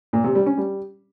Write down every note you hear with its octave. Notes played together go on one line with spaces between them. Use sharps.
A#2
C3
G3
C#4
G3